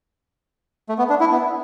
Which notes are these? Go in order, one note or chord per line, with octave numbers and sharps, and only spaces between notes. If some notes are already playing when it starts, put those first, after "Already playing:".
A3
B3
D4
E4
B3